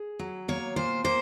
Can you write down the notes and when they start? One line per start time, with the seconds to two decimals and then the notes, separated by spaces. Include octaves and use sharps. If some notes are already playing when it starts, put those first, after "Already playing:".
Already playing: G#4
0.19 F#3
0.48 A#3 C#5
0.76 A#2 C5
1.04 A#3 C5